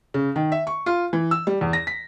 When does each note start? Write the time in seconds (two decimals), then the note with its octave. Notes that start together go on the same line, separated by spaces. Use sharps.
0.14 C#3
0.36 D#3
0.52 E5
0.67 C#6
0.86 F4
1.13 E3
1.31 E6
1.47 G3
1.61 E2
1.73 A#6
1.87 B6